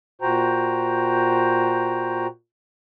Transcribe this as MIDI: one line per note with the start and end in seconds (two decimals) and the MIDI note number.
0.22 2.27 46
0.22 2.27 66
0.22 2.27 72
0.22 2.27 79
0.22 2.27 82